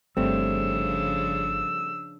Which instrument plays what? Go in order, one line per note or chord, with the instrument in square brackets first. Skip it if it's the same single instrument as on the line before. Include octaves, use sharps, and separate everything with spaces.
[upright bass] G1 [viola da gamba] C#3 F3 D4 [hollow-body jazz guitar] G3 A3 C4 [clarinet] E6